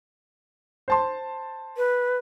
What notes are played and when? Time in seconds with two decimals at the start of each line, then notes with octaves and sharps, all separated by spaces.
0.88 C5 A5 C6
1.77 B4